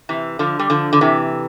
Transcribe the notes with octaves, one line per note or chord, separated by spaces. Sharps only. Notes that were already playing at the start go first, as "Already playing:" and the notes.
C3 E3
D3 F3
G3
D3 F3
D3
C3 E3